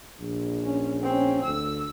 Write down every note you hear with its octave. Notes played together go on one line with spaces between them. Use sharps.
A#1
C#4
C4 C#4
D2 E6